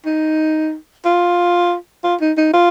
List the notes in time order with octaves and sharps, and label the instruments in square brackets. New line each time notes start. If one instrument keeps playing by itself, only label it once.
[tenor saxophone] D#4
F4
F4
D#4
D#4
F4